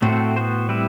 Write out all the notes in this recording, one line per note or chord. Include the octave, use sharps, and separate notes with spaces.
A2 A3 C4 F#4 C5
B3 F#4 C5
G3 C4 E4 B4